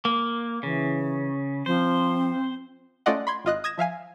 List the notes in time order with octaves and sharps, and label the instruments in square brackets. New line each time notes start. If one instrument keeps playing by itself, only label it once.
[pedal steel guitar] A#3
[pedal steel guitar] C#3 [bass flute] E3
[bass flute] F3 [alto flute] C4 [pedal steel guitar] C5
[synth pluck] A3 C#4 F4 D5 D#5 F#5
B5 C6 G#6
G#1 F4 D#5 F#6
D#6 G#6 A#6 E7
F3 E5 F5 G#5